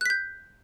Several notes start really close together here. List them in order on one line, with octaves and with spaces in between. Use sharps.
F#6 B6 G6